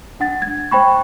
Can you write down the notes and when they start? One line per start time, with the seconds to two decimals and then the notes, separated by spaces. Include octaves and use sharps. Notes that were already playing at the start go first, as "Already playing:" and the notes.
0.20 D4 F#5 A6
0.42 G#6
0.71 C5 G5 B5 C#6